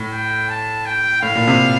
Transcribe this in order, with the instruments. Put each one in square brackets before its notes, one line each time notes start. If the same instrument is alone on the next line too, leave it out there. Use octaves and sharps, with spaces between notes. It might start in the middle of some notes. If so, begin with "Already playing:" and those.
Already playing: [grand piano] A2
[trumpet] G5
A5
G5
[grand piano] A2 [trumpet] F5
[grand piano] A#2
C3